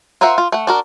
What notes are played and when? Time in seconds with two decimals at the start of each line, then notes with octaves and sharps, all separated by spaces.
0.21 F4 A#4 C5 E5 F#5
0.38 F4
0.52 A3 F#5
0.67 D4 F#4 A#4